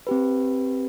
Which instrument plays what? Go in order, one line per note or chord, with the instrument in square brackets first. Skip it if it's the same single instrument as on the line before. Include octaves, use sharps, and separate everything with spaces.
[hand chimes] C4 G4 B4